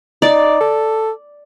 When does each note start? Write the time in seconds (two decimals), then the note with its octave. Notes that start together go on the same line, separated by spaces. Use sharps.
0.22 D#4 D5
0.60 A4